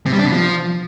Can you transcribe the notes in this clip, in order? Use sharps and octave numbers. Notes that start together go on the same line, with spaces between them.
C3
G3
D4
B2
F3